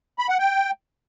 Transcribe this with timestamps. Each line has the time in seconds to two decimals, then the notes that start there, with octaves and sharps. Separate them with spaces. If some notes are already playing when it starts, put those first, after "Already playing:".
0.19 B5
0.29 F#5
0.39 G5